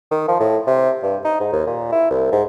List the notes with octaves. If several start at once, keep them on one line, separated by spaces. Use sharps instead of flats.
D#3
F3
A2
C3
G2
D#4
G#2
D#2
A#2
E4
C2
G#2